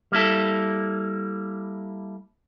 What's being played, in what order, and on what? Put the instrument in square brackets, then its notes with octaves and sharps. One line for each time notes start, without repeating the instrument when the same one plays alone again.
[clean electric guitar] G3 A#3 E4 A4